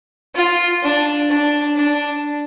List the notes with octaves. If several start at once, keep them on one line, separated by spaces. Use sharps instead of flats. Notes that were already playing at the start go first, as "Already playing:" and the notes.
F4
D4
D4
D4